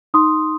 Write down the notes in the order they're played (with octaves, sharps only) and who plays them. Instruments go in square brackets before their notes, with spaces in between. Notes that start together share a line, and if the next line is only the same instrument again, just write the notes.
[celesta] D#4 C6 D#6